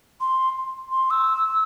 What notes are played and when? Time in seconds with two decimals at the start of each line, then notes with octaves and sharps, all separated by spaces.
0.21 C6
0.92 C6
1.10 E6